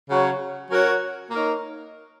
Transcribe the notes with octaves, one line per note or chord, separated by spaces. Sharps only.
C#3 F#3 C#4 F#4 C#5
F#3 C#4 F#4 A#4 C#5
A#3 D#4 A#4 C#5